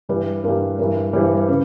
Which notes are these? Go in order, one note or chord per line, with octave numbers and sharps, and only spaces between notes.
G2 E3 G3 B4
G2 E3 G3 A#4
G2 E3 G3 A#4
G2 E3 G3 C5
B4
B4
C#3 B4